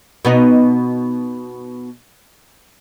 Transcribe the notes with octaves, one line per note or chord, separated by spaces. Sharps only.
B2 B3 D#4